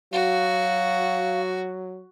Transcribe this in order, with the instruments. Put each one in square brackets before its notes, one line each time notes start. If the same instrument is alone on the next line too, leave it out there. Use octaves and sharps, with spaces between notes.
[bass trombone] F#3 [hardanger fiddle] F#4 [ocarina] F5